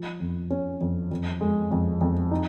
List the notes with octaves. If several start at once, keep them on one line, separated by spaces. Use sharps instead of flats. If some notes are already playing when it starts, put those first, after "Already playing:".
Already playing: F3
F2
C#4
F2
F2
G#3
F2
F2
D#4